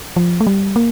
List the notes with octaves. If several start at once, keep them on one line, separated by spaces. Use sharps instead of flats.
F3
A3
G3
A#3